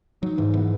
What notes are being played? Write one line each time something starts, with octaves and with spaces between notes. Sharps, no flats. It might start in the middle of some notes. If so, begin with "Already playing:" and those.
F#3 D#4
G#2 E3
E3 B3